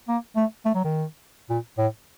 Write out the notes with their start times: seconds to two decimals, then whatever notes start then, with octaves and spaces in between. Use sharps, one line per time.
0.09 A#3
0.36 A3
0.66 A3
0.75 F#3
0.84 D#3
1.50 A#2
1.78 A2